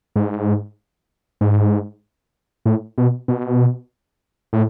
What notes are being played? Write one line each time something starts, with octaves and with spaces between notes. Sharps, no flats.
G#2
G#2
A2
B2
B2
A2